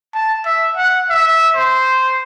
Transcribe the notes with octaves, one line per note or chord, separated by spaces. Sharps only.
A5
E5
F#5
E5
C5